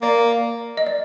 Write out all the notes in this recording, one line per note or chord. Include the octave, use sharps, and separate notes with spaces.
A#3 D5
D#5
D5